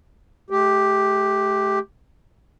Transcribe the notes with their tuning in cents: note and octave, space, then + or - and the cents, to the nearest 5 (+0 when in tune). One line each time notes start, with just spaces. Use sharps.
A3 -35 G4 +0